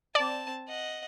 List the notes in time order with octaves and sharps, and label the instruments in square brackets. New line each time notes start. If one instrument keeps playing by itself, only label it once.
[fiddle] C4 A5 [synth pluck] D5
[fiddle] D#5 F#5